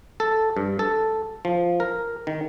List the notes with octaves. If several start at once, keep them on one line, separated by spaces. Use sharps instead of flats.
A4
G2
A4
F3
A#4
D#3